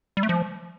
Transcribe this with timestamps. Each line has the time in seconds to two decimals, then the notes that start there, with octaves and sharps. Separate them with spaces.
0.17 G3
0.23 A3
0.29 F3